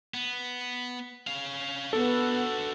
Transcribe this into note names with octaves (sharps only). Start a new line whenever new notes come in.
B3
C#4 F5
B3 D4 F#4 A4